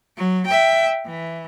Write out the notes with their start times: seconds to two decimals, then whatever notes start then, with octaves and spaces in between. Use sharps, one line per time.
0.17 F#3
0.46 E5 G5
1.06 E3